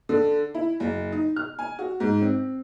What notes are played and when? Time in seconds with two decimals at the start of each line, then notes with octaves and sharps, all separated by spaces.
0.09 D3
0.55 E4
0.80 F#1
1.12 D#4
1.36 F6
1.59 G#5
1.79 F#4
2.00 G#2
2.21 C4